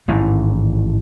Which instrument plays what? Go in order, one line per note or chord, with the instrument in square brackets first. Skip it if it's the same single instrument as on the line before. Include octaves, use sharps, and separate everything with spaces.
[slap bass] A1 G#2 D#3 E3